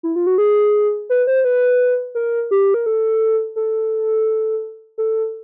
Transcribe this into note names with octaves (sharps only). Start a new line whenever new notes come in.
E4
F4
F#4
G#4
B4
C5
B4
A#4
G4
A#4
A4
A4
A4